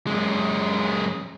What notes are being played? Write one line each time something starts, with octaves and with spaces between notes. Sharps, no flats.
F#2 G#3